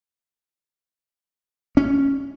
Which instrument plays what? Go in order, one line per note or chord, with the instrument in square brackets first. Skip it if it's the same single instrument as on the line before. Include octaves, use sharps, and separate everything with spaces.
[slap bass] C#4